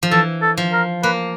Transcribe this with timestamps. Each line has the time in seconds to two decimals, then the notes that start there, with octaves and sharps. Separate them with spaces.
0.03 F3
0.12 E3 A4
0.42 A4
0.57 F3
0.72 A#4
1.03 A#3 B4